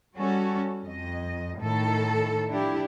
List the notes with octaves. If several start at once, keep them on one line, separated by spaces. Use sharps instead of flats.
G3 C#4 F#4 A4
F2 D#5
A2 D#3 A4
F3 D4 E4 G4